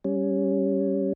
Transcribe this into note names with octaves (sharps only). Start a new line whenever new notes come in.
G3 C#4